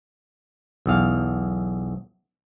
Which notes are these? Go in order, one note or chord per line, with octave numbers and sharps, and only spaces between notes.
B1 E2 F5